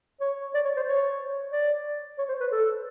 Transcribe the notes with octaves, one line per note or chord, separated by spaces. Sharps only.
C#5
D5
C#5
C5
C#5
D5
C#5
C5
B4
A4